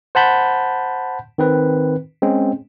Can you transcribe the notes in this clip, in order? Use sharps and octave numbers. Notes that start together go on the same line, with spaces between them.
C5 F#5 A5 B5 G6
D#3 C4 B4
G#3 C4 C#4